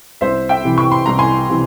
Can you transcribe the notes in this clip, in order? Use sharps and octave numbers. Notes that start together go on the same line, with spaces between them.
C2 C5 E5
E5 G5
C3 E3
C#6
C6
C2 A#5
G#5 C6
C3 E3